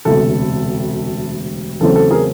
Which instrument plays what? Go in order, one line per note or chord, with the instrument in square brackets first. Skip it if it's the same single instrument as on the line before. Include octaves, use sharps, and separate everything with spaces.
[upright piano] E1 D2 C3 A4
E2 C#3 F#3 A3 C4 A4
A4
G#4 A#4